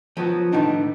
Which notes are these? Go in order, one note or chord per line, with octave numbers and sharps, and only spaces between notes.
F3 F#3 B3 F#4
A2 D#3 F3 B3 D4 D#4